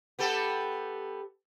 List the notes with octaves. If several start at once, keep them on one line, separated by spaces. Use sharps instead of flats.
B3 G4 A4